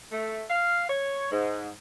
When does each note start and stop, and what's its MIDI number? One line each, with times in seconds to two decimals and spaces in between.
0.12 0.43 57
0.50 0.89 77
0.89 1.27 73
1.31 1.68 44